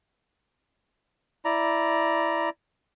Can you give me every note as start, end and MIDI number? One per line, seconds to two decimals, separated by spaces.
1.45 2.50 64
1.45 2.50 74
1.45 2.50 82